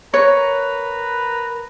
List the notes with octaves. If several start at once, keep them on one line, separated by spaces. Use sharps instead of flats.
A#4 B4 C#5 A#5